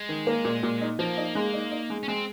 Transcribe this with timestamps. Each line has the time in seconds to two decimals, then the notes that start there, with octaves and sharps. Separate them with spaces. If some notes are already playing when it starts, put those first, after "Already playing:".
Already playing: G#3
0.09 D#3
0.27 A#3
0.45 A#2
0.63 A#2
0.81 D#4
0.99 F3 A#3
1.17 D#4
1.35 G#3
1.54 D#4
1.72 D#4
1.90 G#3
2.03 C#4
2.08 G#3 C4